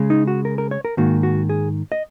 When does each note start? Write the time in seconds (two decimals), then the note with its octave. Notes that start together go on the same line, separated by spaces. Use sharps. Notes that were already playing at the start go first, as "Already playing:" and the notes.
Already playing: C#3 G#3
0.10 D#4
0.27 F#4
0.45 A#4
0.58 A#4
0.71 C#5
0.85 A#4
0.97 G#2 D#3 A#3 F#4
1.23 F#4
1.49 G#4
1.92 D#5